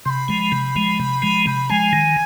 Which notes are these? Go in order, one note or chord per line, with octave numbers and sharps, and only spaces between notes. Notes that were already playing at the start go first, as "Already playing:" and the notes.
C3 B5 C6
F3 G#3
C3
F3 G#3
C3
F3 G#3
C3 B5
F3 G#3 G#5
D#3